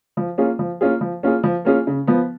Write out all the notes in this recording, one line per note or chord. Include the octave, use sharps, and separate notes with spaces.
F3
A#3 C#4 F4 G#4
F3
A#3 C#4 F4 G#4
F3
A#3 C#4 F4 G#4
F3
A#3 C#4 F4 G#4
C#3
F3 B3